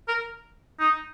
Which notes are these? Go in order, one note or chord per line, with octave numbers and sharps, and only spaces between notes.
A#4
D#4